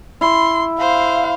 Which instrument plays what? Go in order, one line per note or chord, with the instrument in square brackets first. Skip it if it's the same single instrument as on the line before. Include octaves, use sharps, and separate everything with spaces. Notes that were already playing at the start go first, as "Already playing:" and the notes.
[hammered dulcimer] E4 [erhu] C6
[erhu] C5 [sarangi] F5